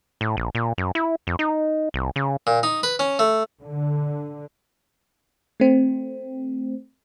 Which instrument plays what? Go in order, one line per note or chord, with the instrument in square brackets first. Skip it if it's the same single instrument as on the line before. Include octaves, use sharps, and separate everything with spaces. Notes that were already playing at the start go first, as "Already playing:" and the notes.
[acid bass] A2
A#1
A#2
F#2
E4
F2
D#4
C2
C#3
[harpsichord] A#2
D#4
B4
C#4
A3
[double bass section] D3
[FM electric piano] A3 C4